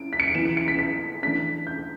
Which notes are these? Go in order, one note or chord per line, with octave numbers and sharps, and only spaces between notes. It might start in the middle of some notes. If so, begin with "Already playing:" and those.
Already playing: C#4 E4 D7
B6
C#7
D7
E3 B3 E4 E7
D7
C#7
B6
B6
E3 A3 D4 B6
G6